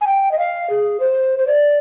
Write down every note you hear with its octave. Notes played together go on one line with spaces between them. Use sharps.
G#5
G5
D#5
F5
G#4
C5
C5
D5